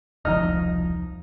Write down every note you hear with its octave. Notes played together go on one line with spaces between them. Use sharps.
E1 C2 F3 D#4 D#5 F6